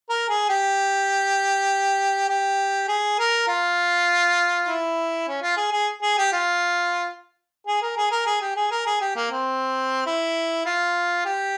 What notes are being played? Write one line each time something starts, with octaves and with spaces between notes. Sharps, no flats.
A#4
G#4
G4
G4
G#4
A#4
F4
E4
C#4
F4
G#4
G#4
G#4
G4
F4
G#4
A#4
G#4
A#4
G#4
G4
G#4
A#4
G#4
G4
A#3
C4
E4
F4
G4